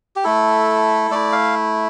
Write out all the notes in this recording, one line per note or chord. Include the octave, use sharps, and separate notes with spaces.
G4
A3 E4 A4
A3 E4 D5
F5